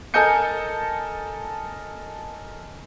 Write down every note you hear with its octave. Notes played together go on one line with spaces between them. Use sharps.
A4 A#4 D#5 G#5 G6 C#7